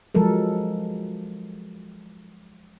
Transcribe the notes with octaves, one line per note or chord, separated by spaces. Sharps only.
F3 F#3 G#3 A4 A#4